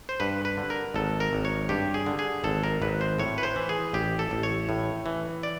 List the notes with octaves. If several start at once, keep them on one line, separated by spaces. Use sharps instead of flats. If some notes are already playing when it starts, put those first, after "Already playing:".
C5
G2 B4
B4
D3
A#4
G#1 A4
A#4
G#1
C#5
G2 G4
G#4
D3
G#4
G#1 A4
A#4
G#1 B4
C5
A2 C#5
B4
C5
E3
G#4
A1 G4
A4
A1
C#5
A2
E3
D5